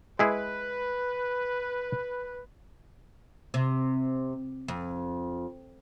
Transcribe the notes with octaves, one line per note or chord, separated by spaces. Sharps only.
G#3 E4 G#4 B4
C3
F2